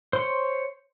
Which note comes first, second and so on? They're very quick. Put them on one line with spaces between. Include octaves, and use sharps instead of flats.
C5 C6 C#5